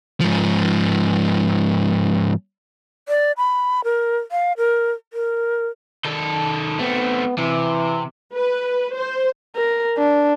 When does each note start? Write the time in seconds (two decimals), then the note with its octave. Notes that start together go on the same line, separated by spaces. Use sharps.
0.21 G#2 F3
3.09 D5
3.37 B5
3.84 A#4
4.32 F5
4.57 A#4
5.13 A#4
6.05 D#3 A4
6.80 A3 B3 C4
7.38 C3 E3
8.34 B4
8.95 C5
9.56 A#4
9.98 D4